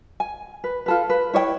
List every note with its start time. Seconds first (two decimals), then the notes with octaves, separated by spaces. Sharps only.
0.20 G#5
0.64 B4
0.86 F4 A4 B4
1.10 B4
1.34 E4 C#5 D5 G5